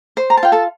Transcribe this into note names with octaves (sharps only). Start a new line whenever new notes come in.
C5
A#5
A5
F4 G5
A4 A5